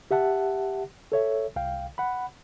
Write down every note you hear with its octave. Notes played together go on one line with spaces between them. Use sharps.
G4 E5 F#5 A5
A4 C#5 E5
C2 F5 G5
F#5 B5